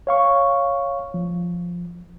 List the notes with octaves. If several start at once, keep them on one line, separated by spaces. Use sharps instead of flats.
C#5 F5 C#6
F3